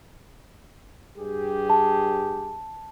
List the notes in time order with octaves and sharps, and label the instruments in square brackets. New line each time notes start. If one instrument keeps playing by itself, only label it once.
[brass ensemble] G2 G4 G#4
[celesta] A5